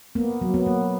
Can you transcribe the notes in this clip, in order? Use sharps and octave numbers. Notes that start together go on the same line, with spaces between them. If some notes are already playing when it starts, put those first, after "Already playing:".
A#3 B3
F#3
B3
A#3